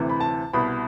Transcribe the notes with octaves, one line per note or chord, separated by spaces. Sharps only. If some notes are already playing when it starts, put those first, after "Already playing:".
Already playing: D2 C3 E3
B5
A5
C2 B2 B5